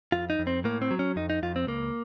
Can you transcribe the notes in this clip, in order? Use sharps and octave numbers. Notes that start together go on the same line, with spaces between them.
F2 F4
D#4
F2
C4
A2 A#3
C4
F#3
C#4
F2 D#4
D#4
F2 F4
C4
C#2 A#3